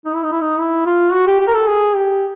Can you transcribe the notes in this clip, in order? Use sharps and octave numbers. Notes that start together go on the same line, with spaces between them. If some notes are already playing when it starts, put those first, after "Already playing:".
D#4
E4
D#4
E4
D#4
E4
F4
F#4
G4
G4
A#4
A4
G#4
G4